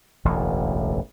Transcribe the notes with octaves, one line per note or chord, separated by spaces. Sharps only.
E1 A1 D2